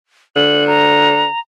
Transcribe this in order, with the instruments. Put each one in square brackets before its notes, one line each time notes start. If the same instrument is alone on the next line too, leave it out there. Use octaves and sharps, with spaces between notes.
[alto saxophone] D3 [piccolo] F#7
[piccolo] A#5